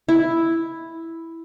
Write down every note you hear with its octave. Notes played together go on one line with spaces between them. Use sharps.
E4